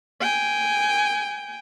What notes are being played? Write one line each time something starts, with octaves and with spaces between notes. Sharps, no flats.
G5 G#5